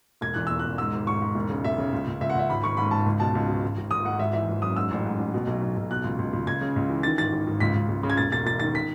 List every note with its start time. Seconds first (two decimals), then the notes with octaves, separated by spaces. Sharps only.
0.21 E1 G#6
0.34 E2 F#6
0.47 E1 E6
0.59 F#6
0.65 E1
0.78 G#2 E6
0.92 G#1
1.06 G#2 C#6
1.22 G#2
1.35 E1
1.49 C#3
1.64 E1 E5
1.78 C#3
1.92 C#2
2.07 C#2
2.21 C#2 E5
2.30 F#5
2.35 C#2 E5
2.50 G#1 B5
2.64 G#1 C#6
2.77 G#2 B5
2.91 G#1 A5
3.06 C#2
3.20 B2 A5
3.35 C#2
3.48 B2
3.63 G#1
3.77 G#1
3.91 G#1 D#6
4.05 G#2 F#5
4.19 G#1 E5
4.33 E3 E5
4.48 G#1
4.62 F#2 D#6
4.76 G#2 E6
4.91 A1
5.05 G#2
5.19 A1
5.34 B2
5.47 B1
5.62 B1
5.77 B1
5.91 B2 F#6
6.04 C#2
6.19 C#2
6.33 C#2
6.47 C#2 G#6
6.61 C#3
6.76 C#2
6.90 E3
7.03 D#3 A6
7.18 G#1 A6
7.33 G#1
7.47 G#1
7.60 C#2 B6
7.74 C#2
7.89 C#2
8.03 C#3
8.10 G#6
8.17 E1 A6
8.32 E1 A6
8.46 E1 A6
8.60 D#3 A6
8.75 B6